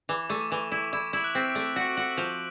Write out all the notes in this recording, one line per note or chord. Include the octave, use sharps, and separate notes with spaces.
E3 D6
A3 C#6
C#6
E3 D6
C#6
E4
C#6
E4 D6
E4 E6
F#6
C4 B6
D7
A3 D7
F#4
F#4 F#7
F3